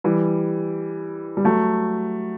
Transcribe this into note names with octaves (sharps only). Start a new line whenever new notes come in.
E3 G3
G3
F#3 A3